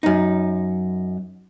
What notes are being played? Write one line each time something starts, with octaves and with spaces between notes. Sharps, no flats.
F#2 D#4